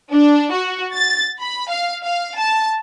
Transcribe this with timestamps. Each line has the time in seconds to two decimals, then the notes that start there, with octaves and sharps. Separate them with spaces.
0.11 D4
0.51 F#4
0.94 A6
1.40 B5
1.69 F5
2.04 F5
2.38 A5